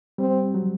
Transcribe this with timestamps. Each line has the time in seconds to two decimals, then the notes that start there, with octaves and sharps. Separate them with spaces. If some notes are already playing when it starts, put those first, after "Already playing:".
0.18 G3 C4
0.54 F#3